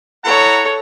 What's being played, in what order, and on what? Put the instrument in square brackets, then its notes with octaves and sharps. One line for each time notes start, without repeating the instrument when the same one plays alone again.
[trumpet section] E4 F#5 A#5 [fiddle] A4 C#5